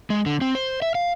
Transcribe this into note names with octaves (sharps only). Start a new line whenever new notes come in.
G#3
D3
C4
C5
E5
F5